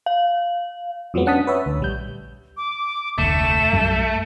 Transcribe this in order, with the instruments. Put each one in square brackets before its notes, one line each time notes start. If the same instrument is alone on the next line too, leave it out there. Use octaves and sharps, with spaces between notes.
[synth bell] F5
[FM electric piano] F2 F3 F#3 G#3 B3
C#4 D4 F#5 A5 D#6 B6
B4 C#5 E5
D2
A#1 G3 G6
[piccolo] D6
[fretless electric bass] F1 D2 [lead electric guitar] A3 [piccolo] E7
[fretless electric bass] B1 F#2 G3